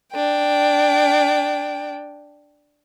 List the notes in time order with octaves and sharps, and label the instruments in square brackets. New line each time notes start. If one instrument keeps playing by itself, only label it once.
[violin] D4 G5